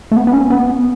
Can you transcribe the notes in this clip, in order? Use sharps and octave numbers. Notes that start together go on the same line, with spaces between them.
A3
B3
B3
C#4
B3